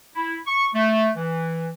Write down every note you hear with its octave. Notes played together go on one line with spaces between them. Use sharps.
E4
C#6
A3
E3